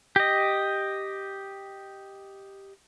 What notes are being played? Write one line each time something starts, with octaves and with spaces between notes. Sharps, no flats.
G4 D#5